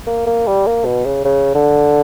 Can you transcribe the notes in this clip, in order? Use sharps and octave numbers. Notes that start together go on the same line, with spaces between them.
A#3
A#3
G3
A#3
B2
C#3
C#3
D3